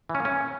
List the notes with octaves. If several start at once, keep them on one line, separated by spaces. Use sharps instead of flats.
E3
C#4
A#3
C#4